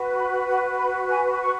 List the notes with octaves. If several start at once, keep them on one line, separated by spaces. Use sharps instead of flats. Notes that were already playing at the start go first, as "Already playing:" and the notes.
Already playing: F#4 B4
B5
F#5
B5
G#5
C#6